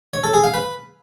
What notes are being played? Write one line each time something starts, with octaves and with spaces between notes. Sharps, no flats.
C#5
A4
G#4
F5
B4